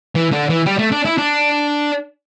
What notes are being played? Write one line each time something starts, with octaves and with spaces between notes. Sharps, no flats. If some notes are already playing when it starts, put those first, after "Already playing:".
E3
D3
E3
G3
A3
D4
E4
D4